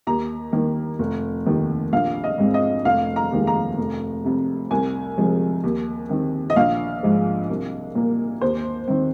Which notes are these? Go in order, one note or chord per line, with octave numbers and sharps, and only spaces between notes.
D#2 A#5
D#3 A#3
F1
D#2 D#3
A#1 F5
D#5
G#2 G#3 C4
D#5
F1 F5
A#5
D#2 D#3 G#3
A#5
F1
F2 C3
C2 G#5
C3 F3 G#3
D#2
D#3 C4
D#5
A#1 F5
G#2 F3 G#3
C2
A#2 A#3
D#2 C5
D#3 C4